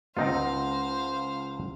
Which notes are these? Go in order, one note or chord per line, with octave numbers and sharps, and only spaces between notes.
C#2 C4 D#4 F4 C5 F5 F#5 A#6